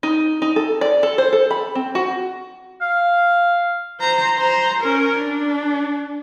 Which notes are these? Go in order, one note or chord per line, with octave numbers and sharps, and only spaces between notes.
D#4
D#4
A4
D5
A4
C5
A4
B5
C4
F#4
F5
C5 A#5
C5 A#5
C#4 A#4
D4